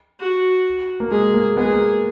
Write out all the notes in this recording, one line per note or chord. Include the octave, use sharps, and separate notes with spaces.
F#4
A#3
G#3 G#4
A#3
G#3 B3 G#4
A#3